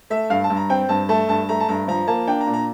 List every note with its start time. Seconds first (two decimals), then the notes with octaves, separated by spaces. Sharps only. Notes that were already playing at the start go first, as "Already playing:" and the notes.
0.10 A3 E5
0.30 G2 F5
0.44 A5
0.50 G2
0.57 A#5
0.70 C4 G5
0.89 G2 A5
1.09 A3 A5
1.28 G2 A5
1.49 A3 A#5
1.60 A5
1.68 G2 A#5
1.88 F3 A#5
2.07 A#3 A5
2.27 D4 G5
2.41 A#5
2.47 A#2
2.53 A#5